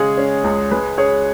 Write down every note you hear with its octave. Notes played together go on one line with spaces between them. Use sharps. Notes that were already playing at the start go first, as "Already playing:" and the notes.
Already playing: C#3 G#3 G#4 C#5
C#4
C#2
G#3 B4
C#4 G#4 C#5